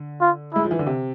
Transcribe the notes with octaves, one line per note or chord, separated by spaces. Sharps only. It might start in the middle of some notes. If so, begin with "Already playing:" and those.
Already playing: D3
F4
G#3 E4
F3
E3
D3
C3